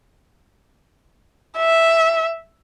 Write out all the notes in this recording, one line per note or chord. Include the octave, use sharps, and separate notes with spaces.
E5